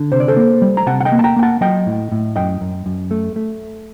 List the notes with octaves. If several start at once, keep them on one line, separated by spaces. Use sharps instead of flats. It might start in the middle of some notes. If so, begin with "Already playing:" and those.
Already playing: D3
C3 C5
D5
A4 C5
A#3
G3
A#5
C3 F#5 A5
F#5
D#5 G5
A#3
A5
G5 A#5
A#3 G5
F#5 A5
F#3 D#5 G5
A2
A2
F#2 D#5 G5
F#2
F#2
A3
A3